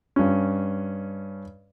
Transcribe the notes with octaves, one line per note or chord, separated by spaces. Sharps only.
G2 C#4